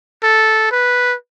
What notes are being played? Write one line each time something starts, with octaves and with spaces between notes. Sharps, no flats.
A4
B4